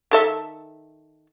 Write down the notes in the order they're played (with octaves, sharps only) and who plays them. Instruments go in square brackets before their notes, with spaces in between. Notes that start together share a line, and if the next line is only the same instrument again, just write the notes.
[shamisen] D#3 A4 E5